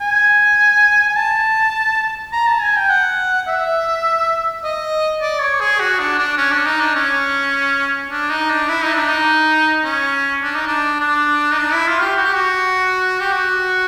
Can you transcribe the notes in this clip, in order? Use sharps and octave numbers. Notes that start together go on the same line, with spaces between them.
G#5
G#5
A5
A#5
A5
G#5
G5
F#5
E5
D#5
D5
C#5
G#4
F#4
D4
D4
C#4
D4
D#4
D4
C#4
D4
D#4
D4
E4
D#4
D4
D#4
C#4
D4
D#4
D4
D4
D#4
D4
E4
F4
G4
F#4
G4
F#4
G4
F#4